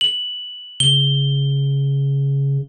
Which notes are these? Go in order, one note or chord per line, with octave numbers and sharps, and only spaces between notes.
F#7
C#3 G7